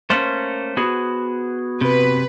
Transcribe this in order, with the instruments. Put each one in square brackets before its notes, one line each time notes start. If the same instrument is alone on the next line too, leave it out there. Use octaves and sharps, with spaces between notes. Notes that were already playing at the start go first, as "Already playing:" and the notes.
[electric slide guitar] A3 A#3 C#4 [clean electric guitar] C5
[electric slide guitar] B3 F#4 G#4
[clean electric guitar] C3 [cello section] B4